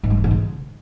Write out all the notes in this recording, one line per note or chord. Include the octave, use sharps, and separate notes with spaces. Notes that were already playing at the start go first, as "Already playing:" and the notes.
G#2
G3
E3
G#2
C#3